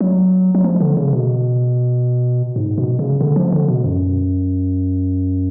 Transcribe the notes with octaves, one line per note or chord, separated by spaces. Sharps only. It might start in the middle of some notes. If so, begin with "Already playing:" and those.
F#3
F#3
F3
D3
C#3
B2
G#2
B2
C#3
D3
F3
D3
B2
F#2